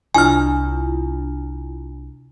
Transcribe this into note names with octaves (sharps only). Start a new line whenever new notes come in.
C2 D4 E4 F4 G#5 F6